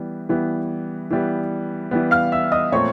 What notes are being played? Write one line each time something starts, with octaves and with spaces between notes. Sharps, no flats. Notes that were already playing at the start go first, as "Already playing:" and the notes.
Already playing: E3 G3 B3
E3 G3 B3
E3 G3 B3
E3 G3 B3
F5 F6
E5 E6
D#5 D#6
A#2 F3 A3 C4 C#5 C#6